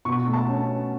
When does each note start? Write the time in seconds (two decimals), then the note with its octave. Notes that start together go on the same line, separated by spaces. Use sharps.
0.05 B2 C#6
0.28 A3
0.33 A5
0.49 C#4